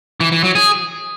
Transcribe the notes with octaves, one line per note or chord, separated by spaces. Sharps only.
E3
E3
F#3
G#4